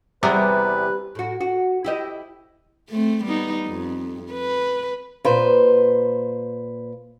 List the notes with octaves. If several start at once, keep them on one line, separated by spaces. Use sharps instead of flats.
E2 C3 G3 B3 E4 A#4 B4
A2 F#4
F#4
E4 G4 D#5
A3 C4
G3 B3 D#4
F2
B4
A#2 B4 C5